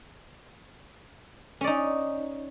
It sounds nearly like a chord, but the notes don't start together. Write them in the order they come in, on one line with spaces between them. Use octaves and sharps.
C#4 D5 D#4